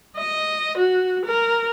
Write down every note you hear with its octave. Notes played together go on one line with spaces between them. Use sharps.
D#5
F#4
A#4